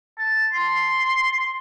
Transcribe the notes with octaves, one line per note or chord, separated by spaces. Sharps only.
A5
C6